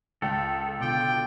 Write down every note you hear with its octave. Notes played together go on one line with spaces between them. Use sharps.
C#2 A4
B2 D3 F4 D5 G5